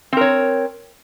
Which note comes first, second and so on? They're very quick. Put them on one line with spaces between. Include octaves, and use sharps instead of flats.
C4 A#4 C#5